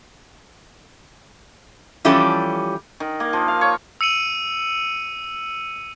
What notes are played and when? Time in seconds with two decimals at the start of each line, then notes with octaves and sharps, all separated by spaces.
2.05 E3 F3 G3 C#4 G4 A4
3.00 D#3
3.20 A#3
3.33 F3
3.48 F5
3.61 C#5
4.01 E6 C#7 D#7 F#7